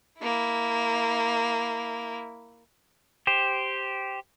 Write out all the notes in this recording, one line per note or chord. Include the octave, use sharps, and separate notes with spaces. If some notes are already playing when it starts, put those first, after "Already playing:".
A#3 E4
G4 C5